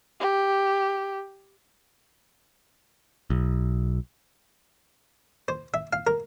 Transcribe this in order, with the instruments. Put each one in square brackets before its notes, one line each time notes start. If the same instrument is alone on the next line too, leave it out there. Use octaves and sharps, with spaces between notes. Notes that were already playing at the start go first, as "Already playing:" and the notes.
[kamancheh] G4
[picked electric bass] B1
[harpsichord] C5
E5
F5
A#4